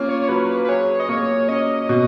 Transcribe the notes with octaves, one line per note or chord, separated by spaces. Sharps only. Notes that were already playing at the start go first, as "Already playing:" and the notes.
Already playing: A#3 C#4 F4
C#5
C#5
F#3 B4
B4
B4
G#4 C#5
D#5
A#3 C#5
C#4 D#5
B2